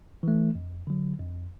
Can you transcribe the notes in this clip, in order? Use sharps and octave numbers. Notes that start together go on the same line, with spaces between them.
E3 A3
F2
D3 F#3
F2